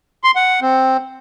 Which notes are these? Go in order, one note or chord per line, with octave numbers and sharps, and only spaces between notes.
C6
F#5
C4